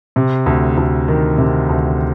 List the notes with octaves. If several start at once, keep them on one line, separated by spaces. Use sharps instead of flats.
C3
D2
D2
D#3
C3
D2